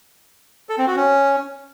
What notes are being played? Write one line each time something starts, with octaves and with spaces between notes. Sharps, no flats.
A4
C4
F#4
C#4